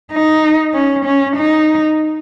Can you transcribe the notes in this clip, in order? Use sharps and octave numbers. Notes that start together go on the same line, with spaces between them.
D#4
C#4
C#4
D#4